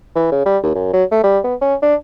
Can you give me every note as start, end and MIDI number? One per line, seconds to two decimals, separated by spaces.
0.15 0.29 52
0.31 0.45 49
0.45 0.58 55
0.63 0.72 39
0.75 0.90 42
0.93 1.04 54
1.11 1.23 57
1.23 1.39 55
1.44 1.55 59
1.61 1.75 61
1.82 1.95 62